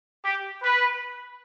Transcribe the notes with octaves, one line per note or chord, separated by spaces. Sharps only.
G4
B4